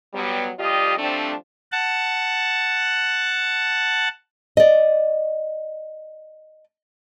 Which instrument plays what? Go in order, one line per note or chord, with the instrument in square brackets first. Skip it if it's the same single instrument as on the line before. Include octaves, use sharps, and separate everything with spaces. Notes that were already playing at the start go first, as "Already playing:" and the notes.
[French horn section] F#3 G3 B3
F2 G3 F4 G4 D5 D#5
F3 G3 A3 C4 D4
[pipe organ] F#5 A5
[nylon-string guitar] D5 D#5